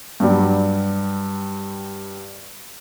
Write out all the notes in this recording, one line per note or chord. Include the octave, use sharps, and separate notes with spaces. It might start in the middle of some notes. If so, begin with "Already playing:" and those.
G2 F#3 G3